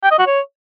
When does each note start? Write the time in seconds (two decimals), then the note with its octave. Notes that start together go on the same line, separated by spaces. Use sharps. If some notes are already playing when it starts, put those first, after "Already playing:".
0.03 G5
0.11 D#5
0.19 F#4
0.27 C#5